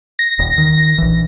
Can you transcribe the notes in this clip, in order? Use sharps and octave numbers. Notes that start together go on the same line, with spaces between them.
A#6
D#1
D#3
A#1 E3